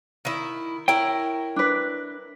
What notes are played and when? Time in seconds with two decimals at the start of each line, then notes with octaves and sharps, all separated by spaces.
0.25 D#3 E4
0.88 E4 A#4 C#5 G5
1.56 D4 B4